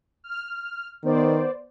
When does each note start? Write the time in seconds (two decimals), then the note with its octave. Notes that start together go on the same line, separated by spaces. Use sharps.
0.24 F6
1.04 D#3 B3 C5 D5